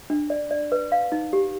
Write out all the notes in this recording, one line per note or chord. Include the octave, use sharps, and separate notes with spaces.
D4
D5
D5
B4
F5
D#4
G4